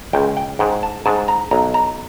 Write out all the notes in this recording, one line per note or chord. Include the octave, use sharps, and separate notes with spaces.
C#2 G5
G5
G#2 G5
A5
G#2 A5
A#5
B1 A#5
A#5